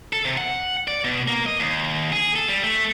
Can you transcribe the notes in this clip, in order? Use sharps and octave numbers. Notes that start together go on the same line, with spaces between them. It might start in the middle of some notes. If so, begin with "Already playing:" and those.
A4
C3
F#5
D5
B2
A#3
D#5
D#2
G#4
A4
G3
A3